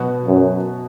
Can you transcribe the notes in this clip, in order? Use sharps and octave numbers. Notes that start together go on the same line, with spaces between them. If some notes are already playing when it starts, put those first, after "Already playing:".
Already playing: B2 F#3 B3 F#4
F#2